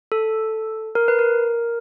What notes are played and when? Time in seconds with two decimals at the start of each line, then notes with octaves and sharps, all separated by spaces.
0.12 A4
0.95 A#4
1.08 B4
1.19 A#4